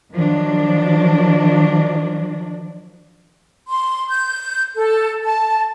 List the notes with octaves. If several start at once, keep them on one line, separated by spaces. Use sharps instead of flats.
D#3 F3 F#3 D4
C6
G6
A4
A5